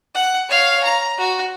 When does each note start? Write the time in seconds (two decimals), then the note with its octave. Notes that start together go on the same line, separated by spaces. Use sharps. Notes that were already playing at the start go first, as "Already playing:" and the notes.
0.15 F#5
0.49 C#5 F5
0.84 A#5
1.18 F#4